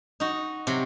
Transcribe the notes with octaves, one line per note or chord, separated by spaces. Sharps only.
D#4 F#4
C3 F#3